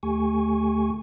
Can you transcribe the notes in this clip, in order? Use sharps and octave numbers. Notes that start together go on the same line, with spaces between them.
D2 A3 G4 G#5 C#6